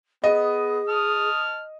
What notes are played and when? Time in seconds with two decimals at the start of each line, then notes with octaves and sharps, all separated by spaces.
0.24 B3 G#4 D#5
0.89 A5 D#6 F6